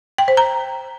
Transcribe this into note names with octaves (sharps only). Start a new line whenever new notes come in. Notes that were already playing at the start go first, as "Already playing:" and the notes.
G5
C5
A#5